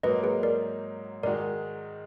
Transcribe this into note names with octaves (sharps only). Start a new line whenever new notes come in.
G#2 F#3 A#3 D#4 B4 D#5
G#4 B4
A#4 D5
G#2 D#3 G#3 D#4 F#4 A#4 D5